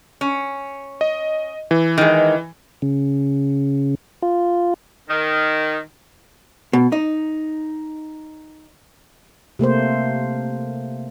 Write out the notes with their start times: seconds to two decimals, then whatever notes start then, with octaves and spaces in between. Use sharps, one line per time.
0.21 C#4
1.01 D#5
1.71 E3
1.98 D#3 G#3
2.82 C#3
4.22 F4
5.08 D#3
6.73 B2
6.92 D#4
9.59 C3 A3 A#3 C5